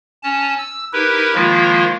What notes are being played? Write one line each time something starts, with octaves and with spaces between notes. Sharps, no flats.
C#4 A5
E6
D#4 E4 G4 A#4 B4
D#3 F3 G#3 A#3 E4 F4